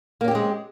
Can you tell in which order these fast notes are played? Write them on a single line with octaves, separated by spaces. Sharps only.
A#3 C#4 G4 C4 G#3